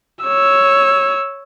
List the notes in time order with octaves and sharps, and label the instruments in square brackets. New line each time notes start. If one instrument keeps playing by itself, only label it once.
[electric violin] C#5 E6